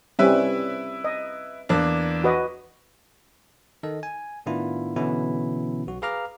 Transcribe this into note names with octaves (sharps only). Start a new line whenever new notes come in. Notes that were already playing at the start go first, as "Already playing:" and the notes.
G3 C4 C#4 E4 B4 E5
D#5
E2 A#3 D4
F#4 B4 D#5
D#3 A4 D#5
G#5
A2 D#3 B3 D4 E4 F4
B2 D3 E3 B3 C#4 E4
B1 F#4
G#4 B4 F5 A#5 D6 F6